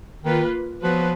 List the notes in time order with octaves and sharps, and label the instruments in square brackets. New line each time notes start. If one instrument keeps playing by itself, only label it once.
[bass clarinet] D#3 [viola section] A#3 F4 B4
[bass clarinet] F3 [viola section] F#3 B3 F#4 B4